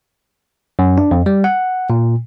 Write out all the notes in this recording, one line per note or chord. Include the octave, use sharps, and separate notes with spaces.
F#2
D4
F2
G3
F#5
A#2